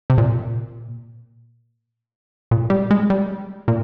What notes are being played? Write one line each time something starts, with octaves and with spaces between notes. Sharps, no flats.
C3
A#2
A#2
G3
G#3
G3
A#2